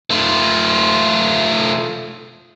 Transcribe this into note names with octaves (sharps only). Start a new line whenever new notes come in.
A3 F4